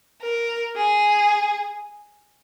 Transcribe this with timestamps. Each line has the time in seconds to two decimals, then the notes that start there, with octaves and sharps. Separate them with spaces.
0.21 A#4
0.76 G#4